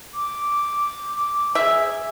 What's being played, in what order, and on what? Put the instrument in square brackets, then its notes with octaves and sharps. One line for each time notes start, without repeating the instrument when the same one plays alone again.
[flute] D6
[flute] G#4 [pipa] E5